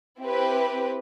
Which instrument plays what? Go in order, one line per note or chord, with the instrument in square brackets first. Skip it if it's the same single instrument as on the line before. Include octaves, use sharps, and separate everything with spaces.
[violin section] C4 E4 G4 B4